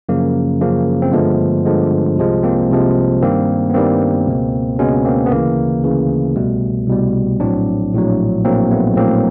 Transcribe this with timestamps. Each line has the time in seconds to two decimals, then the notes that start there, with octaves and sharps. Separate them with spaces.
0.09 F#2 C#3 F3 A#3
0.61 F#2 C#3 F3 A#3
1.02 C4
1.13 G2 D3 F3 G#3 A3 B3
1.65 G2 D3 F3 G#3
2.18 C2 C3 F3 G#3
2.43 A#3 C4
2.70 C2 C3 F3 G#3
3.22 G2 D#3 G3 A#3 C4
3.70 B3
3.74 G2 D#3 G3 A#3 C4
4.27 C#2 B2 G#3
4.79 C#2 B2 G#3 B3 C#4
5.05 A#3 C4
5.26 B3
5.31 D2 C#3 E3 A#3
5.84 D2 C#3 E3
6.36 C2 B2 G3 A3
6.88 C2 B2 G3
7.40 A#1 A2 F#3 C4 D4
7.93 A#1 A2 F#3
8.45 A#1 A2 F#3 A#3 C4
8.71 A3 B3
8.97 A#1 A2 F#3 A#3 C4